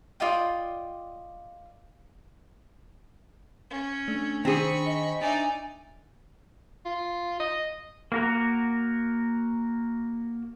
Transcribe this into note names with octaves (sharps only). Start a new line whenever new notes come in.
F4 D5 D#5 G5
C#4
A3 D4
D#3 C4 D4 G#4 C5 B5 C#6
D#5
D4 D#4 D5 E5 G#5
F4
D#5
A#3 F#4 A#4